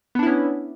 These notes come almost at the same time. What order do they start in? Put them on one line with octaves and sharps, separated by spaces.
B3 D4 E4 C#4